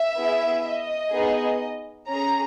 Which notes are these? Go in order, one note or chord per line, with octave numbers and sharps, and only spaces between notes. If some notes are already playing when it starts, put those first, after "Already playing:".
Already playing: E5
B3 E4 G#4
D#5
B3 D#4 G#4
C#4 G#4 A#5